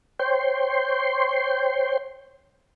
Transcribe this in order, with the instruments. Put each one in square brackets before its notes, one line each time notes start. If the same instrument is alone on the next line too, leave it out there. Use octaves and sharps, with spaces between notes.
[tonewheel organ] C5 C#5 G5 C6